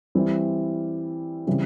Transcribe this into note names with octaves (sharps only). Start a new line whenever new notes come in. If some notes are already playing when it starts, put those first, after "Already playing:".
E3 G3 C4 E4
C#3 E3 G3 C4